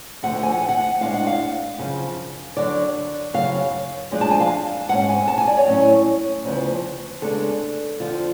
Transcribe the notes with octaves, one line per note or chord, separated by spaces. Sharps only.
D2 D3 F3 A3 F#5
F#5
G#5
F#5
G#5
F#5
A2 G#3 D4 F5
F#5
F5
F#2 C#3 F3
F#2 D3 F#3 D5
F#2 C#3 F#3 F5
F#2 F3 G#3 D4
A5
G#5
F5
G#2 G#3 C#4 F#5
G#5
A5
G#5
D5
C#5
A2 F#3 C#4
D2 C#3 F3 B3
C#3 G#3 B3 D4 A4
F2 D3 F3 F4